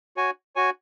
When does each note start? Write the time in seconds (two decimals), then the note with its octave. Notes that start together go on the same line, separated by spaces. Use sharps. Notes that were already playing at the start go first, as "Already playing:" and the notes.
0.17 F#4 C#5 G#5
0.56 F#4 C#5 G#5